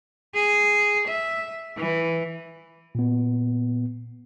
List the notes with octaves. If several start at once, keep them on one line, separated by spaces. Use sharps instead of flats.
G#4
E5
E3
A#2 B3